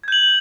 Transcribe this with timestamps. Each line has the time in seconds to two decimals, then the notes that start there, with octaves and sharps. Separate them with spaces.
0.04 G#6
0.08 G6
0.12 F#7